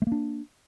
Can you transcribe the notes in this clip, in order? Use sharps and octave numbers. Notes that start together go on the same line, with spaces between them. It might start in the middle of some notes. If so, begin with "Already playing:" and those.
A3 A#3 D4